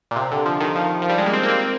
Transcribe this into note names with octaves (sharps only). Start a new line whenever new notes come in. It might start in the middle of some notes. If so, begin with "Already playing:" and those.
A#2
C3
D3
F3
D#3
F3
F3
G3
G#3
A#3
C4
A#3
C4